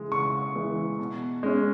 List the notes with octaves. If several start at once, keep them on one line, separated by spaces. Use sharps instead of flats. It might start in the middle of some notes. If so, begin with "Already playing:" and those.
Already playing: C#3 E3 G#3
C#3 C#6
E3 G#3
B2
G#3 C#4